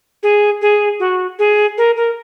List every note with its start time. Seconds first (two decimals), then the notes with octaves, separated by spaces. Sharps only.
0.23 G#4
0.62 G#4
1.00 F#4
1.39 G#4
1.78 A#4
1.96 A#4